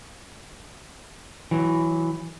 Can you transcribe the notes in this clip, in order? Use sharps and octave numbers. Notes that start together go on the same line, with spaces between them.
E3 F#3